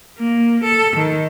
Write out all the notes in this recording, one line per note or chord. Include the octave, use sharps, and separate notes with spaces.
A#3
A4
D#3